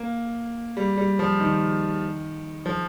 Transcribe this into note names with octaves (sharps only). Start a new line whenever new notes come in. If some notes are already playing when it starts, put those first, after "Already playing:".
Already playing: A#3
G3
G3
F3
D#3
F3